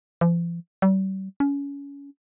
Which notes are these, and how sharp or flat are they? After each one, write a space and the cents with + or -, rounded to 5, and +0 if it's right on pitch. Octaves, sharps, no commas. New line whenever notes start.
F3 -45
G3 -40
C#4 +25